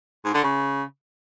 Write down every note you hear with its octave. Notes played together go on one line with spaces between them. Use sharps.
G#2
D3
C#3